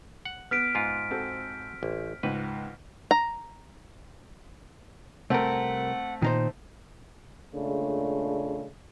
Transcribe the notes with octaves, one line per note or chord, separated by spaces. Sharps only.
F#5
B3 F6 B6 D7
G#2 F4
C4 F#4 A4
A1
C#2 G#2 B4
A#5
C2 A3 C4 A#4 F#5
A#2 D#3 D#4 C5
A#2 C#3 G#3 A3 D4